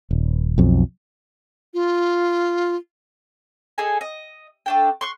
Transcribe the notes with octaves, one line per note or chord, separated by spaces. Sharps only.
D#1
B1 F2
F4
G#4 A4 D#5 G#5
D#5
A3 D4 G5
C6 C#6 F#6